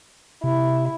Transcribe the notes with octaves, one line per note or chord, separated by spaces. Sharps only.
C3 E4